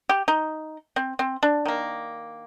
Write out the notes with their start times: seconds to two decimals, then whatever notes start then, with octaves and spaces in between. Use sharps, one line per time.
0.09 G4
0.28 D#4
0.96 C4
1.19 C4
1.43 D4
1.65 D#3 A#3